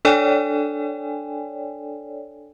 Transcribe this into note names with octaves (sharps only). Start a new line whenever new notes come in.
D4 A4 C#5 D5 G5 G#5